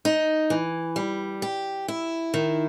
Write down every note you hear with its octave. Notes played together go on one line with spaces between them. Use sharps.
D#4
E3
G3
G4
E4
D#3